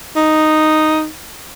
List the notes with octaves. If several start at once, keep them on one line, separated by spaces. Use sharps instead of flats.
D#4